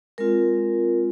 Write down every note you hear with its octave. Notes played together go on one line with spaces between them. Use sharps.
G#3 C4 F4 A#4